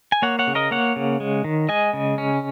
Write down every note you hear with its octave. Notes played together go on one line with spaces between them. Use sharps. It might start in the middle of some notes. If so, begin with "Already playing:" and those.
G#5
A#3 C#5 F#5
C#5 F#5
C#3
A#4 D#5
A#3 C#5 F#5
C#3
G#3
D#3
G#3 D#5 G#5
C#3
C#4